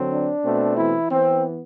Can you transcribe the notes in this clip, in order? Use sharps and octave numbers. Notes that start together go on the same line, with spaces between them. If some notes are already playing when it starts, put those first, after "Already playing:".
Already playing: D3 F#3 C4
D4
B2 A3 C4
E3 E4
E3 B3 C4